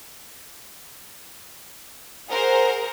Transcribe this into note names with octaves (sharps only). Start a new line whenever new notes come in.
G#4 A#4 C5 F#5